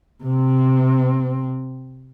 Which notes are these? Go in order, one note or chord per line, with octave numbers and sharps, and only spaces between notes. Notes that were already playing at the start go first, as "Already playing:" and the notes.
C3 C4